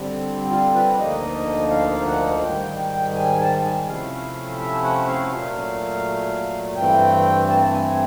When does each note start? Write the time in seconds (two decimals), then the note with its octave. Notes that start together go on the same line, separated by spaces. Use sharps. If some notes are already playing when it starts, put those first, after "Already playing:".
Already playing: D3 G3 C4
0.50 F4
0.75 B4
0.98 D2 D3 F3 A#3 D#4 D#5
1.71 F5
2.06 F#5
2.42 G#2 D#3 G3 G5
3.15 G#5
3.40 A5
3.64 G#5
3.87 C3 F3 A3 C#4 E4 F5
4.59 E5
4.84 F#5
5.08 F5
5.32 A#2 F#3 A3
6.76 G2 E3 A3 C4 G5
7.48 A5
7.73 G#5